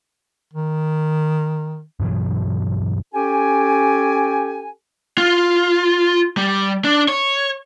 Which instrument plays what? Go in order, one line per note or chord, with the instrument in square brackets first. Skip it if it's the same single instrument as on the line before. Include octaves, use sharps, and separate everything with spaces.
[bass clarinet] D#3
[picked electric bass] G2 B2 E3 F#3
[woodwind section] C#4 G4 A4 G5 G#5
[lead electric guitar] F4
G3
D4
C#5